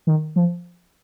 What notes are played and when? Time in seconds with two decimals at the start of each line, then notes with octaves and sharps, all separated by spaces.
0.07 D#3
0.36 F3